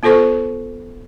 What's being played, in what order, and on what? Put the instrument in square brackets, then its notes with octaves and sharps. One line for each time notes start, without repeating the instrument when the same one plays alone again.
[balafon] B3 F4 A4 C5 C#6